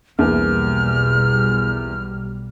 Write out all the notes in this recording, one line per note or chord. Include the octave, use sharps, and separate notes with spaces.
B1 E2 B2 G3 A#3 F6